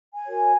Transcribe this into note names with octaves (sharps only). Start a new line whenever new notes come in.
G#5
F#4 A#4 C#5